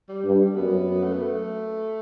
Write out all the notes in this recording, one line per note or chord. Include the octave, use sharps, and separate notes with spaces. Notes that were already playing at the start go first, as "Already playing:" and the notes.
G3
G2
F#2 B3
A3
B3
A3